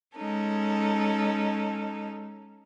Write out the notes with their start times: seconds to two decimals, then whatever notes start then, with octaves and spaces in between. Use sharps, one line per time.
0.16 G#3 C#4 D#4 A4